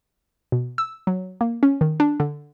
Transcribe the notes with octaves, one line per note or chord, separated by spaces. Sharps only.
B2
E6
F#3
A#3
C#4
D#3
D4
D3